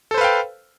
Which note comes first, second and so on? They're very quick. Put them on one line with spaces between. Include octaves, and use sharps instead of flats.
A4 C5 B4 F5 G5